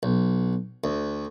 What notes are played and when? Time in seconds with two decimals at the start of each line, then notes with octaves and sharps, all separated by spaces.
0.03 B1
0.84 D2